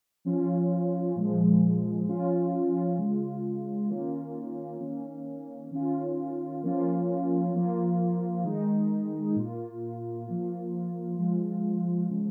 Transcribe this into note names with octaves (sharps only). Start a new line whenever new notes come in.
F3 C#4 F4
A#2 F3 G#3
F3 C#4 F4
C#3 G#3 F4
D#3 A#3 C#4 F4
D#3 A#3 C#4
D#3 C#4 F4
F3 A#3 C#4 F4
F3 A#3 F4
D#3 G#3 D#4
A#2 A#3 F4
F3 A#3 F4
F3 G#3 F4
C#3 F3 G#3